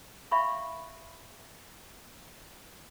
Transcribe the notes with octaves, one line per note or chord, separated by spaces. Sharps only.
E5 F5 B5 C#6